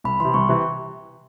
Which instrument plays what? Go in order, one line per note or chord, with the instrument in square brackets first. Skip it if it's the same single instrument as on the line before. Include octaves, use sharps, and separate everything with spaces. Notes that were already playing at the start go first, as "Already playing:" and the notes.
[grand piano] C2 [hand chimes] B5
[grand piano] C3 E3 [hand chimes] C6
[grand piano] C2 [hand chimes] C#6
[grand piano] C3 E3